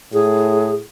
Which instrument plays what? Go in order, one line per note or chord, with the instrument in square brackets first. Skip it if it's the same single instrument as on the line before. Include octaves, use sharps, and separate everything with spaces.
[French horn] A2 [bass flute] G#4